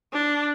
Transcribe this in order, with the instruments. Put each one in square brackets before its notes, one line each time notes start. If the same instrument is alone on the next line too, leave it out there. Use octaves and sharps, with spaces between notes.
[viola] D4